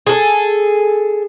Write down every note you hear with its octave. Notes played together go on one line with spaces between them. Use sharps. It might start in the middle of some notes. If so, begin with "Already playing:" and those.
G#4 A4